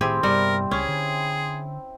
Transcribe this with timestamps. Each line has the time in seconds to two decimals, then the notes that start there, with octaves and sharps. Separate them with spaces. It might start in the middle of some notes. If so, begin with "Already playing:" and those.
0.01 A2 D#3 A3 C4 E4 G4 G#4 C6
0.23 G2 C3 G3 B3 A#4
0.71 C#2 C#4 G#4
0.89 D3